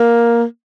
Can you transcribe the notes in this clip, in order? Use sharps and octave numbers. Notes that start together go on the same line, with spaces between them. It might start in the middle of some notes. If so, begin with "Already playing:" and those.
Already playing: A#3